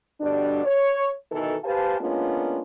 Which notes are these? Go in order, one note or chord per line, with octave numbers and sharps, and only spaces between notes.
B2 D3 G3 D4
C#5
B2 D#3 E3 D#4 A4
G4 B4 C5 F5 G#5 A5
G#3 A#3 B3 C#4 D4 F4